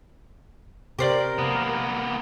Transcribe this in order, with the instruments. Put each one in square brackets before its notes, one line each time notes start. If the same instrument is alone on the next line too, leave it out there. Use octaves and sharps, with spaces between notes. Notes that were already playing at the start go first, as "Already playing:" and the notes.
[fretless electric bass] C3 [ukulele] G4 C5 D5 [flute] A#4
[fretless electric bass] C3 [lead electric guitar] A#3 B3